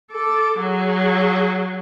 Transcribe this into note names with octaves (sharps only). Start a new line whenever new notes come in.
A4 D6
F#3 G#4